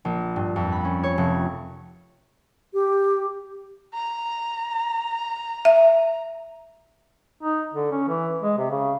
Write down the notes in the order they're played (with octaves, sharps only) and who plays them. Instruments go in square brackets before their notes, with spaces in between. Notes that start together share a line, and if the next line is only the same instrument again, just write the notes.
[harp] A#1
G2
F2
B5
C#4
C#5
F1
[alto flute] G4
[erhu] A#5
[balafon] E5
[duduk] D#4
D3
C#4
E3
G#3
C3
C#3